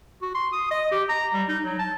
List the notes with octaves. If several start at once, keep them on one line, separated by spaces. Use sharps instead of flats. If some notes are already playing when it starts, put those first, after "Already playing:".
F#4
C6
D#6
D#5
G4
A#5
G3
D#4
F#3
A5